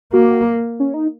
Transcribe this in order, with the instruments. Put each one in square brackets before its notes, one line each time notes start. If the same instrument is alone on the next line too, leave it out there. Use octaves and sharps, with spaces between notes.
[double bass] A#3 [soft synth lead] F#4
[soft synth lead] C#4
D#4